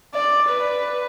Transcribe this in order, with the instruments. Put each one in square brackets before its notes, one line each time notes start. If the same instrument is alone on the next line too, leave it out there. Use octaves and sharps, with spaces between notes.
[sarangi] D5
B4